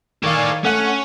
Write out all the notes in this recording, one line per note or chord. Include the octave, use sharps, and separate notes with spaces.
D#3 A4 C#5 D5 F5 G#5
A3 C#4 F#5 F#6